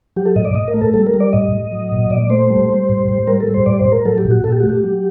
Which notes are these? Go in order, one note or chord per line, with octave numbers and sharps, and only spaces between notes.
F#3 G4
A4
A2 D#5
D5
A2 D#5
A#4
A3
A4
G3 A4
A#4
G3
D5
A2 D#5
A2
F#3
A#2
A#2 D5
A3 C5
G3
G3
A2
A2
G3 A#4
A4
G3
C5
A2 D5
C5
A2
A#4
F#3 A4
G4
A#2
F#4
A#2 A4
G4
A3 F#4
G4
F#3